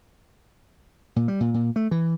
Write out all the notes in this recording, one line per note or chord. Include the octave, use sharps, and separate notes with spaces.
A#2
G3
A#2
A#2
A3
E3